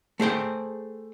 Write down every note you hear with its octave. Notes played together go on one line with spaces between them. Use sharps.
A3 G#4 C5 G5